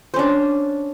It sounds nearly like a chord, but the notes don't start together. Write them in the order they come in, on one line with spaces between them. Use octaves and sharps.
C5 C#4 D4